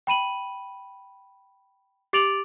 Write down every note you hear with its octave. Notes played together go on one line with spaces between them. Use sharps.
G5 B5 D#7 F#7
G4 D6 A6 D7 F7 F#7